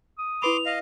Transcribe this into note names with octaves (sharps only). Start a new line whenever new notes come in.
D#6
E4 B4 B5 C6 D6 F7
D#5 F5